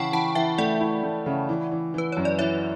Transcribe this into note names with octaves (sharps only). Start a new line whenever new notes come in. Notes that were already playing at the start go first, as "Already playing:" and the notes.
Already playing: C#3 E3 F#5 G5 A5 B5 C#6
E3 F#5 A5
E3 E5 G5
A3 D5 F#5
E4
A3
C#3
E3
E3
E3 B4
F#2 C#5
D5
E3 C#5 E5